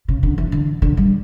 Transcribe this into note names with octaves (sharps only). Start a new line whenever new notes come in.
C#3
D3
E3
D3
D3
G3